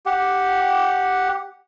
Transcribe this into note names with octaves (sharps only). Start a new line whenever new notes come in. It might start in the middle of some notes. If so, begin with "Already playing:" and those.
G4 F#5